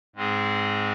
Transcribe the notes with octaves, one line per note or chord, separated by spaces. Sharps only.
G#2 G#3 C4 G#4